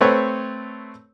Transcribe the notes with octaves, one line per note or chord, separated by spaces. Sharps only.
A3 C4 B4 C#5